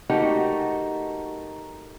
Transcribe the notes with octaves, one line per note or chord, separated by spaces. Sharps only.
A3 A#3 D#4 F#4 G4